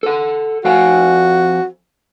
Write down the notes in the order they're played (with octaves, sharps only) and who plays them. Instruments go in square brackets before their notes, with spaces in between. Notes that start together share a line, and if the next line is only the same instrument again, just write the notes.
[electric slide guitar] A4 F#5
[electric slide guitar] F2 F5 G#5 [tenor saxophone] F#4